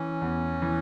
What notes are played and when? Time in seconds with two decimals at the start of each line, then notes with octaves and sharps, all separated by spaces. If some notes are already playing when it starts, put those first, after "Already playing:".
Already playing: E3 C#4
0.21 E2
0.62 E3